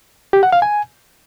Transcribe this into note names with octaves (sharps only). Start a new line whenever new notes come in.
G4
F#5
F5
G#5